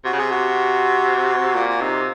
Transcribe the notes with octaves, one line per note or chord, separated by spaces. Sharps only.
C3 F#4
C#3
C3 G#4
F#4
A#2 F4
F4
C3 D#4